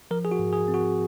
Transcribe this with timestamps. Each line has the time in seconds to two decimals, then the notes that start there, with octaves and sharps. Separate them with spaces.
0.11 F3 A#4
0.25 G#4
0.32 F#4
0.39 G#2
0.53 G#4
0.68 C4
0.74 F#4